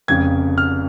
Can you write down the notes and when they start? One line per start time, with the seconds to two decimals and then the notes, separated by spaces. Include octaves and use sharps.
0.08 F1 F2 C#3 G#6
0.58 F6